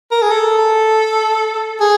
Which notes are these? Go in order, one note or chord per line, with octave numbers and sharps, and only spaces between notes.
A#4
G#4
A4
G#4